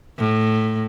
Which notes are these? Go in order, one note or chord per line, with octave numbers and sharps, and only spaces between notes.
A2